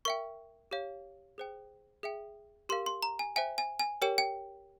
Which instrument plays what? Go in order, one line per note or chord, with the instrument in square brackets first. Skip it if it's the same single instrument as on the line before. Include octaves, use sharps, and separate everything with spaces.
[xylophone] A#4 E5 G5 C#6
G4 C#5 F5
G#4 C5 G5
G#4 E5 G5
G4 A#4 F5 C6
C6
A#5
G#5
C5 E5 G5 G#5
G#5
G#5
G4 A#4 C#5 G5
G5